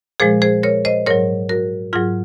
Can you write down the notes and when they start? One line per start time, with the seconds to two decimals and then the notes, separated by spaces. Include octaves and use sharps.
0.20 A#2 F3 G#3 G#4 C5
0.42 G#4 C5
0.63 A#4 C#5
0.85 C5 D#5
1.06 G#2 F#3 A#4 C#5
1.49 F#4 A#4
1.93 G#2 F#3 F4 G#4